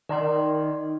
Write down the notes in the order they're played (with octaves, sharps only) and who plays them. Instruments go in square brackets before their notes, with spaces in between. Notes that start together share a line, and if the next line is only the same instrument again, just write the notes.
[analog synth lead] D#3 [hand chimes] D5 C6